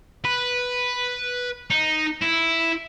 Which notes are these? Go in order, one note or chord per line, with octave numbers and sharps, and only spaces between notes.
B4
D#4
E4